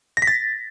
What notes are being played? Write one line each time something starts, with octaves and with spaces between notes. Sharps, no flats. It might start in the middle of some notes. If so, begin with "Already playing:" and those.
A#6
B6
A6